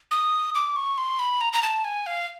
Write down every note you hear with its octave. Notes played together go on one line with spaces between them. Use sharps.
D#6
D6
C#6
C6
B5
A#5
A#5
A5
G#5
F5